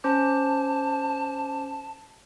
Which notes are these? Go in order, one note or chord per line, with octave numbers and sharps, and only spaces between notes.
C#4 C5 A5 D6